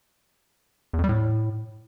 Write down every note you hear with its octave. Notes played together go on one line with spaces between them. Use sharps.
E2
F2
G3
A2